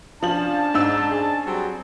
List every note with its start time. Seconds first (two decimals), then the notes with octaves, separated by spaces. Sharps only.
0.23 F3 C#4 D4 A5 F#7
0.74 G#2 D#4 E6
1.11 G#4
1.46 F#3 G3 C4